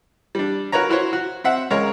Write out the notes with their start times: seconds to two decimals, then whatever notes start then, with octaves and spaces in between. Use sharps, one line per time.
0.35 G3 D4
0.72 F#4 A#4 B4 C#5 A#5
0.89 E4 F#4 C5 C#5
1.13 F#4
1.44 C4 E5 F#5
1.71 C#2 G#3 A#4 C#5 A#5